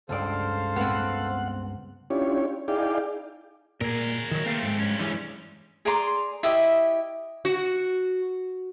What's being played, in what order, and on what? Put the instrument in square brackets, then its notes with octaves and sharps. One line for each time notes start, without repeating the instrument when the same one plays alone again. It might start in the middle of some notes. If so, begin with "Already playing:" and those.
[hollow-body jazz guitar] C#2 G2 D5 [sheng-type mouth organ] A4 C5 F5
[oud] B3 C4 [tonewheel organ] F#5
[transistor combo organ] C#4 D4 E4 F4 G4 C#5
D#4 E4 G#4 D5 F5 G5
[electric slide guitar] A#2 [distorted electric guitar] G#4 A#4
[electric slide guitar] D#3 F#3
[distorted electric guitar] A3 C4 [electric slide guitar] A#3 F5
[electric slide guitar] G#2 G#3
[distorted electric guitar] G2 C#4
[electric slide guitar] E3 G3 G#3
[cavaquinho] G#4 D5 A#5 C6
E4 G4 D#5 E5
[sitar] F#4